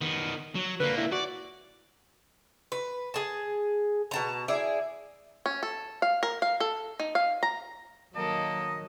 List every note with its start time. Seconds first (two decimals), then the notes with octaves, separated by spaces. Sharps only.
0.01 D#3 B3
0.55 F#3
0.80 D3 A#3 B4
0.97 E4
1.12 F#4 D5
2.72 B4
3.14 G#4 A5
4.11 B2 A5 A#5
4.48 E4 G#4 D5
5.46 C#4
5.63 A4
6.02 F5
6.23 A#4
6.42 F5
6.60 A4
7.00 D#4
7.15 F5
7.43 A#5
8.15 D#3 F#3 A#3 A4 D#5